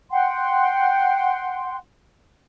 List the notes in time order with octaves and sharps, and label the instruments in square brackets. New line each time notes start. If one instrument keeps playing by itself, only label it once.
[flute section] F#5 G5 C6